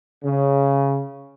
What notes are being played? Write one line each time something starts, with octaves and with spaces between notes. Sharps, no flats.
C#3